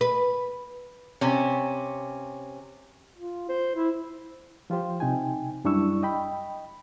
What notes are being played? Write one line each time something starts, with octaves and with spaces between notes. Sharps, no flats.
B4
C3 C#4
F4
C5
E4
F3 F4 G4 C5
C3 D#4 G5 G#5
F#2 G3 D4 E4 C#6 E6
D#5 G5 B5